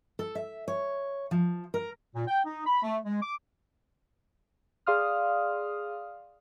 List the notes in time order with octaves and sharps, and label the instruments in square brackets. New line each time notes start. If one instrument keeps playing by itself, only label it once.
[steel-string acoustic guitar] A4
E5
C#5
F3
A#4
[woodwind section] A#2
G5
D#4
B5
A3
G#3
D6
[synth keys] G#4 D5 F5 C6 D#6 F6